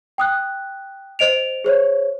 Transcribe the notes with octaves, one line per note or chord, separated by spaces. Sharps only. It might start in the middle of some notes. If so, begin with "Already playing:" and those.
G5 D#6 F#6
C5 D#5 D7 F7
G#4 C5 C#5